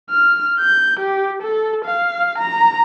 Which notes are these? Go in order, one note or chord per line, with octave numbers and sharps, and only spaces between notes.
F6
G6
G4
A4
F5
A#5